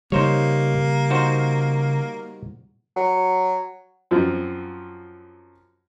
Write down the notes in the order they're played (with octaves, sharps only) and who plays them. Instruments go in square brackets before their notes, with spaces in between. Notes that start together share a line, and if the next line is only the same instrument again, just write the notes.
[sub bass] C#3 [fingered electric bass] G3 [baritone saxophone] A#3 [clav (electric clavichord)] D#4 C5 C#5
[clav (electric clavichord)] D#4 F#4 C5
[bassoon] F#3
[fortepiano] F#2 F3 C4 F4